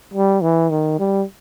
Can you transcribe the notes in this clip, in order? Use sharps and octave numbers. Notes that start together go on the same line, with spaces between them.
G3
E3
D#3
G3